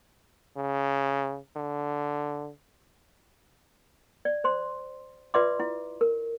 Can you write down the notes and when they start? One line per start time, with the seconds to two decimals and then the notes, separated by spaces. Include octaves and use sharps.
0.56 C#3
1.56 D3
4.25 D5
4.44 C5 C6
5.34 F4 B4 D5 E5 C6 D6
5.60 E4
6.01 A#4